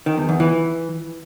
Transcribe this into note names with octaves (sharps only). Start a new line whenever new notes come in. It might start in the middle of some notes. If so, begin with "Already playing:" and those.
D#3
E2
E2
E3